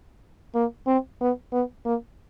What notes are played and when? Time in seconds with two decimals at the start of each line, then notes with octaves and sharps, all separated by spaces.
0.55 A#3
0.87 C4
1.21 B3
1.52 B3
1.85 A#3